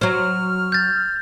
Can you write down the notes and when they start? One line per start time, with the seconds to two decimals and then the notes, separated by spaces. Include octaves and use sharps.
0.01 F#3 C5 F6
0.72 G6 A6